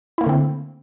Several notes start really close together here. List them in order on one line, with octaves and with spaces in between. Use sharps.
E4 A#3 A3 D3 C4